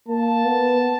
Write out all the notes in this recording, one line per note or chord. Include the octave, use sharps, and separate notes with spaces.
A#3 A5
B3